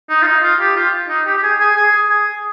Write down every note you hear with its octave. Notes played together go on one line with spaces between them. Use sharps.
D#4
F4
D#4
F4
G4
F4
D#4
G4
G4
G#4
G#4
G#4
G#4